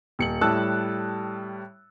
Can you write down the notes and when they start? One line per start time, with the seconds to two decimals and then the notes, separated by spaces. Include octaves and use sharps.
0.19 D#1 C#7 F#7
0.41 A2 G3 A5 E6 F#6